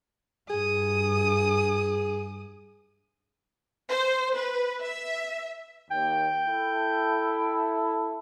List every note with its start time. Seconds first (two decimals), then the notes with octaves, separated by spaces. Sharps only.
0.50 G2 G#4 D#6
3.88 C5
4.35 B4
4.82 E5
5.91 D#2 G5
6.47 E4 A4